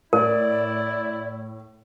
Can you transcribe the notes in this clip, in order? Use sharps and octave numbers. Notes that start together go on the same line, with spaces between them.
A2 E4 A#4 D5